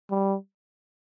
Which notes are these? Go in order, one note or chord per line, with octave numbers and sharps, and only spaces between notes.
G3